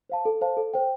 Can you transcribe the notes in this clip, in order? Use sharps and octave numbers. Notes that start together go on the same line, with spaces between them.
C5 F5 A5
A4
C5 F5 A5
A4
C5 G5